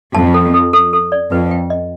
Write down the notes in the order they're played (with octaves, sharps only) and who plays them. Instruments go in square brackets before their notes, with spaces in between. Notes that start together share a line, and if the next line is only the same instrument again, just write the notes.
[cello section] F2 [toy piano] A5
[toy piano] A4
A4
A4
A4
D5
[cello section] F2 [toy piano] B4
[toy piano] G5
D#5